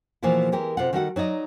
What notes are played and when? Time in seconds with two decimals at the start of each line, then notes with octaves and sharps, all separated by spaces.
0.23 B2 E3 F3 G#3 A#3 E4
0.52 E3 G#3 G4 A#4
0.77 C3 F4 A4 F#5
0.93 D#3 G3 F#4 A4 E5 F#5
1.16 F#3 D#4 D5 D#5